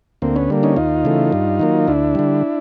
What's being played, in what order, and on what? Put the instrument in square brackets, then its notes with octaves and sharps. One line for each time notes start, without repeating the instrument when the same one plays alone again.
[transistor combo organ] D2 A#3 C4
B3 C#4
D3 G3 A#3
C#4 D#4
D#2 D#4 F4
C#3 E3 A3
G2
D#3 F#3 A#3
D2 D4 E4
D3 G3